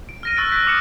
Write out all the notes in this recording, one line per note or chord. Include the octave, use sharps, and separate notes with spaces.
D7
F6 A#6 D#7
C#6 E6 F#6 A6 D7 D#7
F#6 G6 B6
D6 D#6 F6 F#6 C#7 E7